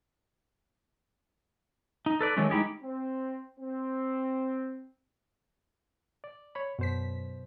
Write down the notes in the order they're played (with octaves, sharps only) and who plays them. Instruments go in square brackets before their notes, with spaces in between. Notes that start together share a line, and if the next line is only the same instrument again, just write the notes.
[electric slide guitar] D#4
A4 B4 D5
D#3 F#3 G#3 A3 C#4
G#3 D#4 E4 G4 G#4
[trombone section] C4
C4
[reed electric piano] D5
C#5 B5
[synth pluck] F#2 B6 [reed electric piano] B2 C5